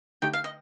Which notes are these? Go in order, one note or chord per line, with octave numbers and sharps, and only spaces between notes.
D3 A3 D#4 G4 G5
F5
D#5